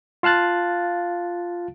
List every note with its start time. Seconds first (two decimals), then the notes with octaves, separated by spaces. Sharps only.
0.23 F4 F5 A5 F#6 A6